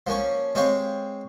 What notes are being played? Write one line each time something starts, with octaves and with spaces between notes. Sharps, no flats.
F3 A#3 C#4 C#5
G#3 C4 G4 C#5 F5